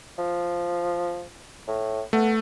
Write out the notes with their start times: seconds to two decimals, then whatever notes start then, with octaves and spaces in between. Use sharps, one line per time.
0.19 F3
1.68 A2
2.13 A3 B3